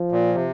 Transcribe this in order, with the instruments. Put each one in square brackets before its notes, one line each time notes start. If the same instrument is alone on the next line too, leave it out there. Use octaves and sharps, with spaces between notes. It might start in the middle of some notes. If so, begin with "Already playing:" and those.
Already playing: [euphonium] F3
[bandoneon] A#2
C3